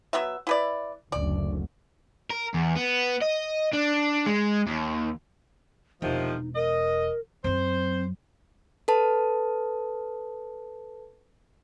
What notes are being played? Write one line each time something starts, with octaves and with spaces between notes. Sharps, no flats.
F#3 B3 E5
E4 B4 D5
F#1 D2 D5
A#4
E2
B3
D#5
D4
G#3
D#2
E1 C3 D#3 F3 D#4
A#4 D#5
F#2 F#3 C4 C5
A4 B4 A5